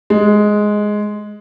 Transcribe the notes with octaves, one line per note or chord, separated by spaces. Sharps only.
G#3